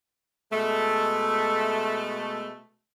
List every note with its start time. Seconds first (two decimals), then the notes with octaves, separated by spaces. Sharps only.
0.52 B2 G#3 A3